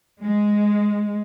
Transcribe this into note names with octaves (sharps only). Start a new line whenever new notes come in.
G#3